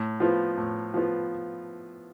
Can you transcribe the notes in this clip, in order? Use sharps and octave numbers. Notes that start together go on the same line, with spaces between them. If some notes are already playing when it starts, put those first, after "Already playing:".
Already playing: A2
F3 B3 F4
A2
F3 B3 F4